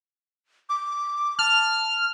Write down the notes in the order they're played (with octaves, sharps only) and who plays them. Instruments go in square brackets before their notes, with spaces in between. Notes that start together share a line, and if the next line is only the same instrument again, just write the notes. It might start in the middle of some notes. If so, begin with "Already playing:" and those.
[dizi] D6
[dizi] A5 [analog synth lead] F6